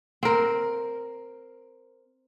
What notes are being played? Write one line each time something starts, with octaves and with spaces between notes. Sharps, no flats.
C4 A#4